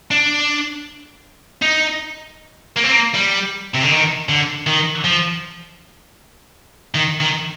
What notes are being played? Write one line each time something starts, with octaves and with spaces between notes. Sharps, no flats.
D4
D#4
A#3
C4
A#3
G3
C3
D3
D#3
D3
D#3
F3
D#3
D#3